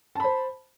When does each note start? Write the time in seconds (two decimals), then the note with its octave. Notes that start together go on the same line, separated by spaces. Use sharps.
0.15 A5
0.20 B5
0.24 C5